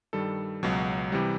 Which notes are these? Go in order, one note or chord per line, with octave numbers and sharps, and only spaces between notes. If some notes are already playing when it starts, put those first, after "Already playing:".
G2 D#3 G3 A4
C#2 B2 F#3
C3 E3 G3